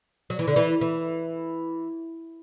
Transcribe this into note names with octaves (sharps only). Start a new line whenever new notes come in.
F#3
E3
D3
E3
E3